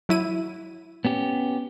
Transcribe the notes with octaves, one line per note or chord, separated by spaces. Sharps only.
F#3 E4 D#7
B3 C#4 G4